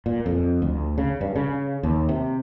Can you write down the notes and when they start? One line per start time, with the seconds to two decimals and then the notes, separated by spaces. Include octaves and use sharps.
0.06 A#2
0.26 F2
0.62 D2
0.98 C#3
1.21 G2
1.36 C#3
1.83 D#2
2.09 C3